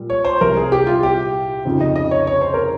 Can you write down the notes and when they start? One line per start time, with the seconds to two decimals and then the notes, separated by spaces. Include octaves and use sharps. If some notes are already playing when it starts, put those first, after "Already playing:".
Already playing: A#2 G3
0.10 C#5
0.25 C5
0.41 C2 C3 G3 A#4
0.57 G#4
0.72 G4
0.87 F4
1.03 G4
1.65 F2 C#3 F3 C4 D#4
1.81 D#5
1.96 D#5
2.11 C#5
2.27 C#5
2.41 C5
2.54 A#4